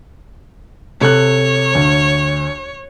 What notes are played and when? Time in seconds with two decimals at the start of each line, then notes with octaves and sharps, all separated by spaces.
1.01 C3 A4 C#5 F#6
1.75 D2